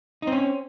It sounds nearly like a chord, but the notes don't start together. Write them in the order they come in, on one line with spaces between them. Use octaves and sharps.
D#4 C4 C#4